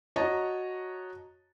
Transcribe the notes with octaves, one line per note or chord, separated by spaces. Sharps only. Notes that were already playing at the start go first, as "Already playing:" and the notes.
F#4 C#5 D#5 A5 A#5